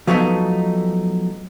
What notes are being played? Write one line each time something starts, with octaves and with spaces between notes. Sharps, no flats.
F3 F#3 A3 B3 D#4